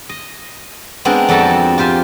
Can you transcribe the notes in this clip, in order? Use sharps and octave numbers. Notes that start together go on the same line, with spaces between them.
D#5
G#3 B3 C4 D4 A#4
F2 G3 F#4 A4 A5
F4 G4 C5 G#5